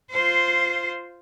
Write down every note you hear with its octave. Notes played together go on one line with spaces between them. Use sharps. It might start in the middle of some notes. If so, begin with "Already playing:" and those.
F4 C5